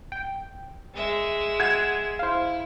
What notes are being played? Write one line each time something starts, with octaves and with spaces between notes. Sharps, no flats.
G5
G#3 E5
F#5 G#6 E7
E4 C5 F5